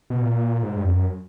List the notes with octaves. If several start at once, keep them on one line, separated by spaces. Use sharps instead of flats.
B2
A#2
G#2
G2
F2
F#2